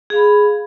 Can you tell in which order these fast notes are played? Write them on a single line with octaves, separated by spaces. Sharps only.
G#4 F5 B5